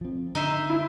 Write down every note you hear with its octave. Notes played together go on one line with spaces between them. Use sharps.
F3 C4
D3 D#4 C5 E5
E4